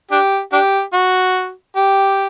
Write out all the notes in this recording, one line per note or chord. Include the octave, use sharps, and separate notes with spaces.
D4 G4
D4 G4
F#4
G4